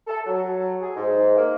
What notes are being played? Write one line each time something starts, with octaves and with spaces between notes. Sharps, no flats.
A4
F#3
G#4
G#2
A#3